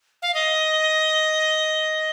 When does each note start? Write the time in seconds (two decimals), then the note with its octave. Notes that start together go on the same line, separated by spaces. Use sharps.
0.22 F5
0.34 D#5